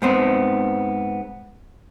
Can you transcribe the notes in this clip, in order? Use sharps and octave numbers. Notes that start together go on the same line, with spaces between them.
G#2 B3 C4